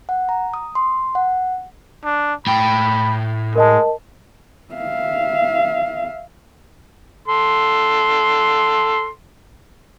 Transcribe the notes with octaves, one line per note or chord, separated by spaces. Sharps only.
F#5
A#5
D#6
C6
F#5
D4
A2 G5 B5
G#3 A#4 D#5 A5
E5 F5
A4 C6